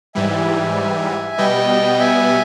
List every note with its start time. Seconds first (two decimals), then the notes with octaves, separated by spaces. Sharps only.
0.15 G#2 E3 G3 E5 G#5
1.37 B2 G3 B3 D#5 G5
1.99 E5 G#5